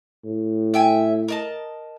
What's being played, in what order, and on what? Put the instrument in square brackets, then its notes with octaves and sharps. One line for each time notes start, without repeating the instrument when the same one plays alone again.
[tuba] A2
[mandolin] E5 G5 G#5
A#4 D#5 A5